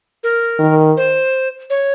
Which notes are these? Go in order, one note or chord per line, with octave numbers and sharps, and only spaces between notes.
A#4
D#3
C5
C#5